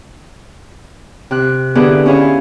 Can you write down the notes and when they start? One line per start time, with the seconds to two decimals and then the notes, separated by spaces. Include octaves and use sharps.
1.31 C3 F#6
1.75 D3 B3 E4 G4 G#4 B4
2.06 C#4 E4 G#4 C#5 F5 G#5